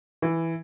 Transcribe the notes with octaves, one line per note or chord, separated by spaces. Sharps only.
E3